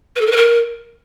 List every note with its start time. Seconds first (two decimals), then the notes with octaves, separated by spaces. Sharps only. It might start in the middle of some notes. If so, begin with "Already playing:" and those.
0.16 B4
0.21 A4
0.26 A#4
0.31 B4
0.36 A#4